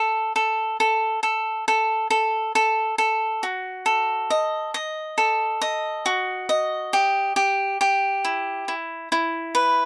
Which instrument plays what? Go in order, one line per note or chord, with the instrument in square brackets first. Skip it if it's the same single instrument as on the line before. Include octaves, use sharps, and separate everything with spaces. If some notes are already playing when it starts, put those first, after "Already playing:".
Already playing: [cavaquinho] A4
A4
A4
A4
A4
A4
A4
A4
F#4
A4
D#5
D#5
A4
D#5
F#4
D#5
G4
G4
G4
E4
E4
E4
B4